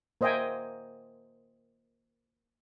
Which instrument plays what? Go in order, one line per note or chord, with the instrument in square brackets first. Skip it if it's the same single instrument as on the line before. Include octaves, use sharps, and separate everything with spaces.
[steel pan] A#3 C5 D#5 E5 G5 G#5